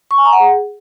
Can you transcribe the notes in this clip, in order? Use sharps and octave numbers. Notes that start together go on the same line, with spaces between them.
C#6
G#5
A#5
F#5
G#4